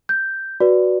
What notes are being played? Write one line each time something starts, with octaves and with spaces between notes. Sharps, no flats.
G6
F#4 B4 D5